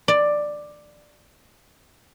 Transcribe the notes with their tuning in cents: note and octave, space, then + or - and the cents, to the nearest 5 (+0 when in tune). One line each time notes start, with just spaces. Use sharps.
D5 +10